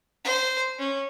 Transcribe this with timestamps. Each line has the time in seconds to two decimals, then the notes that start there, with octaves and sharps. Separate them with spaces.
0.25 C5
0.79 C#4